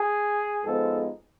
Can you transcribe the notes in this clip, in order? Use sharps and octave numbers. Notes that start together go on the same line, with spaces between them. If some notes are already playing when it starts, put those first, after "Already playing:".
Already playing: G#4
G#2 F3 G#3 B3 A4